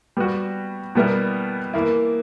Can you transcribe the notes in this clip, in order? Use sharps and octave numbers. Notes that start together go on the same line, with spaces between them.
G3 B3 F#4
B2 G3 B3 E4 A#4
E3 A#3 E4